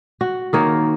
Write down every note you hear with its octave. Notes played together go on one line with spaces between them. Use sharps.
F#4
D#3 A#3 C#5